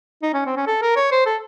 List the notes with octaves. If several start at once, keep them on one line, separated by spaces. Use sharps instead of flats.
D#4
C#4
C4
C#4
A4
A#4
C#5
C5
A4